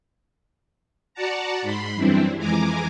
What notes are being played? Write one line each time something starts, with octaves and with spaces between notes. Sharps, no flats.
F#4 D5 F#5 A5 A#5
G#2 B5 C6
F#2 E3 G3 C4 D4 E4
F2 E3 G#3 G#5 A#5 D6